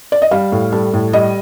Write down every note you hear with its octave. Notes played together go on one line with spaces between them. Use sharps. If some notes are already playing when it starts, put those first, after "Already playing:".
D5
D#5
G3 F5
A2
G3 A4
A2
G3 D#5